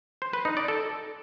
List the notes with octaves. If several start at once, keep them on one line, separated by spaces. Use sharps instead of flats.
C5
B4
D#4
D5
A4